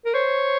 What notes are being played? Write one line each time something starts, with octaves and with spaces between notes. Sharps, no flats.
A#4
C5 C#5